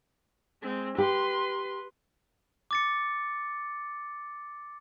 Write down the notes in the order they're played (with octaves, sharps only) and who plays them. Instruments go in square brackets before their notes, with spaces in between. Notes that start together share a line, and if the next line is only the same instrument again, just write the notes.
[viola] G#3 C4
[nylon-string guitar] G4 [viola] B4 C6
[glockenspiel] D6 A6 C#7